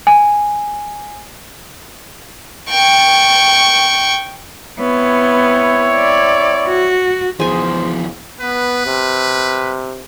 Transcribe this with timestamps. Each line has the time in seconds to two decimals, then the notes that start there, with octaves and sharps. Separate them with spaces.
0.07 G#5
2.70 G5 C#6
4.80 B3 C4 E4 C#5
5.94 D5
6.68 F#4
7.40 E2 D#3 F3 G#4 C5 G#5
8.41 B3 B4
8.86 C3